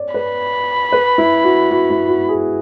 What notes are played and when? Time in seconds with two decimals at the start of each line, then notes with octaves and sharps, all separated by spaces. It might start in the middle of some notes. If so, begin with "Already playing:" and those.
Already playing: C#5 D5
0.14 B4 B5
0.92 B4
1.18 E4
1.44 F#4
1.71 F#4
1.90 E4
2.09 F#4
2.29 G#4